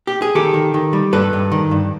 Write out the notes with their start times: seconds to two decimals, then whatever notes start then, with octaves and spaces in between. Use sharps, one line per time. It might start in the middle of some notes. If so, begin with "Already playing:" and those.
0.07 G4
0.22 G#4
0.35 D#3 G4 A4
0.54 D#3
0.74 D#3
0.93 G3
1.12 G2 A4 B4
1.33 G2
1.52 D#3
1.71 G2